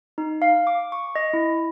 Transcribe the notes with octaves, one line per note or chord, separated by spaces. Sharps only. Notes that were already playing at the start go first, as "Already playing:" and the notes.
D#4
F5
D6
C#6
D#5
E4